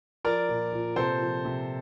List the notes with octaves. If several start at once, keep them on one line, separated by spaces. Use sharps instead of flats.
F3 A#4 D5
A#2
A#2
C3 A4 C5
F3
C3